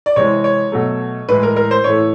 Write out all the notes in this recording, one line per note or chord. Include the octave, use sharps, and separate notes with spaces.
D5
C3 E3 G#3 C#5
C#5
B2 F#3 A3
A2 E3 G#3 B4
A#4
A#4
C5
A2 E3 A3 C#5